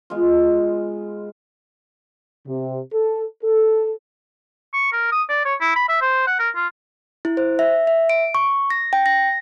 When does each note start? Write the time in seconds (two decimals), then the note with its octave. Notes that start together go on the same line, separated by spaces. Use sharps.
0.10 G#3 B3 F4
2.48 C3
2.93 A4
3.44 A4
4.73 C#6
4.92 A#4
5.12 D#6
5.29 D5
5.45 C#5
5.61 E4
5.76 B5
5.88 E5
6.02 C5
6.27 F#5
6.39 A#4
6.55 F4
7.25 E4
7.37 C5
7.59 E5
7.87 E5
8.10 D7
8.35 C#6
8.70 A#6
8.93 G5
9.06 A#6